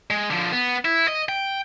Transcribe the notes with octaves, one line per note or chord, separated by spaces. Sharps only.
G#3
D3 F3
B3
E4
D#5
G5